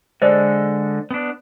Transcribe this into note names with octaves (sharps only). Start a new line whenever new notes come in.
D3 G#3 A4 C5 D5 D#5
B3 D4